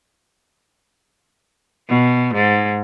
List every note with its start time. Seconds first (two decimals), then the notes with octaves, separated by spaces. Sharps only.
1.89 B2
2.35 G#2